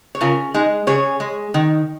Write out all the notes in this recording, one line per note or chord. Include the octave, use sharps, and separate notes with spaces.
C#5
C#3 F4 A#4
G#3 D#4 G#4
C#3 G#4 C#5
G#3
D#3